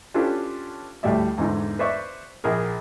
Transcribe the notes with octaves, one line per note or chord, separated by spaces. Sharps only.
C#4 D4 F4 G4 A4 B4
D2 A2 G3 A3 D5 E5
E2 G#2 D3 D#4
B4 C5 D5 E5 C#6
A#1 G#4 A#4